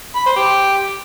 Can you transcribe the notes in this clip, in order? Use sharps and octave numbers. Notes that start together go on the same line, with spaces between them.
B5
C5
G4